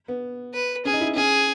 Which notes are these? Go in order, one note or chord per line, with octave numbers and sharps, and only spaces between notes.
B3
B4
C#4 G#4
D#4
E4
C#4 G#4